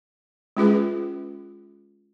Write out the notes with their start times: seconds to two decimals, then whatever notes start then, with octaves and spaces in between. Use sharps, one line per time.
0.57 G#3 C#4 F4 G#4 B4